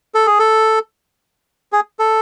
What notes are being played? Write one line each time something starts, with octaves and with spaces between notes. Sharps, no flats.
A4
G#4
A4
G#4
A4